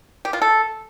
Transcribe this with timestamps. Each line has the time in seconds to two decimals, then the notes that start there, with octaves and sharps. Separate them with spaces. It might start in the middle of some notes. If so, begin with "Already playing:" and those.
0.25 G4
0.33 F4
0.42 A4